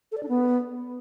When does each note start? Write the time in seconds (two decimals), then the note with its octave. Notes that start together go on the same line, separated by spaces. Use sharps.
0.12 A4
0.17 D5
0.23 D4
0.29 B3